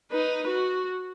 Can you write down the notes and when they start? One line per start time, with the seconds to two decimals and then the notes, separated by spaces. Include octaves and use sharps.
0.12 D#4 B4
0.48 F#4